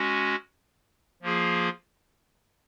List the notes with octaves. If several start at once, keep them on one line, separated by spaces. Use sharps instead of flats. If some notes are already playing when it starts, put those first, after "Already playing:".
Already playing: G#3 C#4 F#4
F3 A#3 F4 G#4